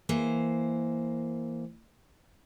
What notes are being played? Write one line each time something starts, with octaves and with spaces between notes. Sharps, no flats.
E3 A#3 C5